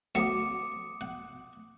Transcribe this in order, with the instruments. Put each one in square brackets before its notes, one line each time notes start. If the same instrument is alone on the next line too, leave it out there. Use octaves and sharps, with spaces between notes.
[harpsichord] D2 F#3 [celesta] D6 D#6 C#7
[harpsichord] F#5